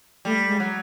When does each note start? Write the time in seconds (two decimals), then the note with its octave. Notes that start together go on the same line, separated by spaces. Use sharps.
0.25 G3 A3
0.49 G#3
0.60 F#3